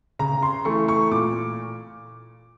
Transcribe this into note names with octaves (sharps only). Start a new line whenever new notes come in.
C#3 A#5
C6
E3 A3 C#6
C#6
A#2 D6